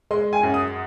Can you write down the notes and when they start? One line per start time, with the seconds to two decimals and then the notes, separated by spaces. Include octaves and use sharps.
0.11 G#3 C6
0.33 G#5
0.43 F#2
0.54 D#6